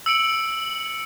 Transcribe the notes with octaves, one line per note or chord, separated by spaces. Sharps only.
E6 C#7 D7 F#7